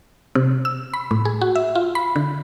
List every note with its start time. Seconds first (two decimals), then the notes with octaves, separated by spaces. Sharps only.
0.35 C3
0.65 E6
0.94 B5
1.11 A2
1.25 G#4
1.41 F#4
1.55 E5
1.75 F4
1.95 B5
2.16 D3